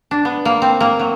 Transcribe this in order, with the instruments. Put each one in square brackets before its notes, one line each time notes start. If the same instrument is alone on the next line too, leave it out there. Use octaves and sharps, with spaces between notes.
[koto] D4
B3
A#3
C4
A#3
F#3